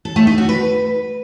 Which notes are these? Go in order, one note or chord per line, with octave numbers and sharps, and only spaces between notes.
A4
A3
D#4
F#4
B4